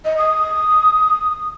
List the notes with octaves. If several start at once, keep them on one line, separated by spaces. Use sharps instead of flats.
D#5
D#6